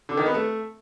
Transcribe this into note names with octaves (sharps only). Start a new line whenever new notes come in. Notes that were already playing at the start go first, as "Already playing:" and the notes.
D3
D#3
B3
A3